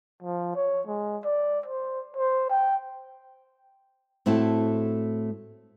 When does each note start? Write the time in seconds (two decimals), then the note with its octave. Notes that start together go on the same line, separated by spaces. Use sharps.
0.23 F3
0.56 C#5
0.87 G#3
1.25 D5
1.66 C5
2.16 C5
2.50 G5
4.26 A2 A3 C4 E4 F#4 A5